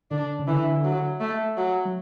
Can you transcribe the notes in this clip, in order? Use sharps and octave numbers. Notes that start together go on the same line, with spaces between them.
D3 D4
C#3
D3 E3
F#3
A3
F#3
F#3